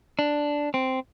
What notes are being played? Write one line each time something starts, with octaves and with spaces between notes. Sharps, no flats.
D4
C4